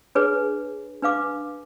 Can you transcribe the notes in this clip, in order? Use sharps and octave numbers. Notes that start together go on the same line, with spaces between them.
D4 G#4 B4 C#5
D4 B4 F5 D6